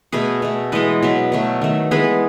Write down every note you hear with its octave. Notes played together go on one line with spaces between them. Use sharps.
B2 A3 G#4 B4
B2 A3
E3 G#3 B3 B4 D#5
B2 F#3 B3
B2 F#3 A3
D#3 A3
E3 G#3 B3 G#4 B4